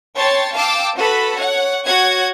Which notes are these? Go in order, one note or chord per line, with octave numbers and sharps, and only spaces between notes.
C#5 G5 A5 C6 A6
F5 G5 A5 D6 E6
F#4 A4 B4 B5
C#5 F#5
F#4 C#5 F#5 G#6